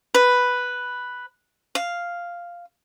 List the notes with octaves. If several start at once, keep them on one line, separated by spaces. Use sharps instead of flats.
B4
F5